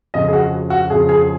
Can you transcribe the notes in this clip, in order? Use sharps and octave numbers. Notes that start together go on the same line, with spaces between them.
F2 C#3 D#5
G#4
F#4
F#4
F2 C#3 G#4
G#4